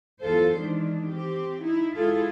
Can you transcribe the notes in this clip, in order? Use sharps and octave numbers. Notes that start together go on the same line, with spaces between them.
E2 F#3 F4 A4 C5
D#3 E3 G#3 D4
C4 G4
D#4 E4
G#3 E4 F4 G#4 A4